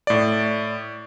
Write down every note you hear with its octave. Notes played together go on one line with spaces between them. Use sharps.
A2 D5